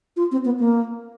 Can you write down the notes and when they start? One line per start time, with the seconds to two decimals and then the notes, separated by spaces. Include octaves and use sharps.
0.17 F4
0.32 C4
0.45 B3
0.59 A#3